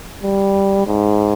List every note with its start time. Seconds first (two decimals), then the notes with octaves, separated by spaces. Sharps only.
0.23 G3
0.87 G#2